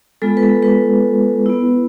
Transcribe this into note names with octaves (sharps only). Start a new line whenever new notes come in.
G#3 B3 F4 A4
B4
A4
B4
B3 E4